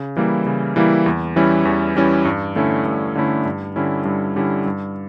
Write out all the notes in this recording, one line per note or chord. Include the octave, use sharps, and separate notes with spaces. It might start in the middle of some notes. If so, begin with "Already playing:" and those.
Already playing: C#3
E3 G3 A#3 E4
C#3
E3 G3 A#3 E4
E2
E3 G3 C#4 E4
E2
E3 G3 C#4 E4
G2
D3 A3 C#4 E4
G2
D3 A3 C#4 E4
G2
D3 G3 C#4 E4
G2
D3 G3 C#4 E4
G2